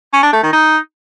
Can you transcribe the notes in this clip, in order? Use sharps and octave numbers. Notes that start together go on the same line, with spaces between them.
C#4
D4
A3
D#3
D#4